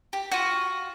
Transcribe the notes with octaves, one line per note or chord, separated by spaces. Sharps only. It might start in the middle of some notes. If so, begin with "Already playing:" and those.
G4
F4 F#4